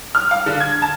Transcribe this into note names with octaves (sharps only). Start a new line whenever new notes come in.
F6
F5
D3
G#6
A5